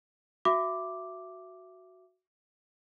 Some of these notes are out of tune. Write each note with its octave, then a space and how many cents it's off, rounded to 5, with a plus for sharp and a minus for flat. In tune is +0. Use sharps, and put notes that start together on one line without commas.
F#4 +0 E5 +20 D6 +0